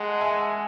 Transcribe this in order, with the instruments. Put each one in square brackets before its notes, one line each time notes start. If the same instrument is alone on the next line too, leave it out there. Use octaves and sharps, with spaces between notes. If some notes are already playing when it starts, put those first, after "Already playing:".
Already playing: [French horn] G#3 [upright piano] F#5 A5
[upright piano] E5 G#5